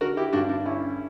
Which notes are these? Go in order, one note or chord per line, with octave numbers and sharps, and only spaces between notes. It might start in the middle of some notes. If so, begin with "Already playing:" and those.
D3 F#4 A#4
E4 G4
G2 D4 F#4
D4
D3 C#4 E4